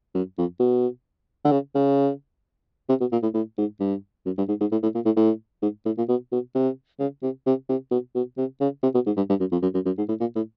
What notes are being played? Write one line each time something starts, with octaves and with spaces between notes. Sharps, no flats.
F#2
F2
B2
D3
C#3
C#3
C3
B2
A#2
A2
A2
G#2
G2
F#2
G2
G#2
G#2
A2
A2
A#2
A2
A2
G#2
A2
A#2
B2
B2
C3
C#3
C3
C3
C3
B2
B2
C3
C#3
C3
B2
G#2
G2
G2
F#2
F2
F#2
F#2
F#2
G#2
A2
A#2
A2